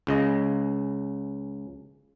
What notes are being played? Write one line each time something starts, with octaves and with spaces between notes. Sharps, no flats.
C#2 C#3 D#5